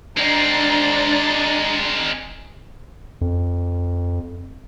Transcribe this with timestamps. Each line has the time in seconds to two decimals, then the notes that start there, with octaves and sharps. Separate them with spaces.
0.17 G#3 C4 D4 A#5 A6
3.21 F2